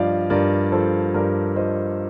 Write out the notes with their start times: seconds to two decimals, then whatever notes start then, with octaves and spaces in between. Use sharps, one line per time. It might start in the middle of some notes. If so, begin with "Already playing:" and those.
Already playing: G2 F3 D5 D#5 F5
0.30 G2 A#4 D5
0.72 F3 A4 C5
1.14 G2 A#4 D5
1.56 F3 C5 D#5